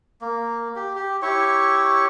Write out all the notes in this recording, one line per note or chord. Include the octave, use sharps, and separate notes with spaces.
A#3
G4
G4
E4 G4 C#5 C#6